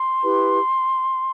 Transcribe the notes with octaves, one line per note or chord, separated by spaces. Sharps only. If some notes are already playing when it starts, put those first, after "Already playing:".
Already playing: C6
E4 G4 B4